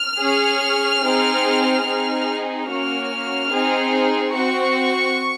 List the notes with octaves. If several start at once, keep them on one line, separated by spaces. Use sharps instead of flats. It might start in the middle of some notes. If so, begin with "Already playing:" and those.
Already playing: F6
C#4 G#4
C4 D#4 G#4
C4 D#4 G#4
A#3 C#4 F#4 F6
C4 D#4 G#4
C4 F#4 C#6